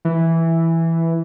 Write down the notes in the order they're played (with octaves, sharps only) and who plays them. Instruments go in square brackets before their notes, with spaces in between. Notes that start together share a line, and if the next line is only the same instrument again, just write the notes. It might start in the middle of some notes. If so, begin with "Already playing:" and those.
[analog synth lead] E3